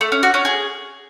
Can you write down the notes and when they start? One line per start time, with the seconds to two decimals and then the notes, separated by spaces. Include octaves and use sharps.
0.01 A3
0.12 C#4
0.23 F#4
0.34 C#4
0.45 G#4